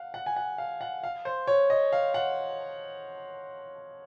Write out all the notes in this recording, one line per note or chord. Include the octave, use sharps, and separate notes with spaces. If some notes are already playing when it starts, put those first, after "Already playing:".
Already playing: F5 F#5
F#5
G#5
F#5
F5
F#5
F5
C5
C#5
D#5
F5
F#5